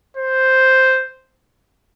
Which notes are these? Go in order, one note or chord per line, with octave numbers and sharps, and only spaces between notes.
C5